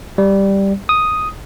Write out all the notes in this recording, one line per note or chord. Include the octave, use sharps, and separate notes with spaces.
G3
D#6